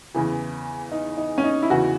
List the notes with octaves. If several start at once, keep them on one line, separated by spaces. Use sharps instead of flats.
E2 C#3 E3
D#4
D#4
C#4
D#4
E4
E2 C#3 E3 F#4